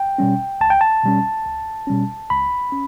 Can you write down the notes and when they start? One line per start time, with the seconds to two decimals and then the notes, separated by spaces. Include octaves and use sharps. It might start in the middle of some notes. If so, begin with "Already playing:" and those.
Already playing: G5
0.18 B2 G3 C#4
0.61 C#2 A5
0.70 G5
0.81 A5
1.03 B2 G3 C#4
1.46 C#2
1.87 B2 G3 C#4
2.30 C#2 B5
2.72 C#4